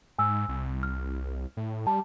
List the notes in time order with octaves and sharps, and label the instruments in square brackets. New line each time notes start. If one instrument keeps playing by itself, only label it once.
[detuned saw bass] G#2 [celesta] G#5 E6
[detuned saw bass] C2
[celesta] F6
[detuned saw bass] A2
[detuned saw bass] G3 [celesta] A5